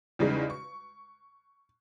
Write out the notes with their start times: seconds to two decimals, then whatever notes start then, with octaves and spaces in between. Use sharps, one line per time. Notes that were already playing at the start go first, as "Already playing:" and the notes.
0.19 E2 C#3 G3 G#3 D#4
0.50 C#6